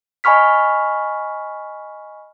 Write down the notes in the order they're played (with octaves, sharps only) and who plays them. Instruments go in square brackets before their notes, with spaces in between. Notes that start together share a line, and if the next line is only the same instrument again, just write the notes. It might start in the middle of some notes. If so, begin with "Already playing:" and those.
[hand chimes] D#5 G#5 B5 C#6 F6 B6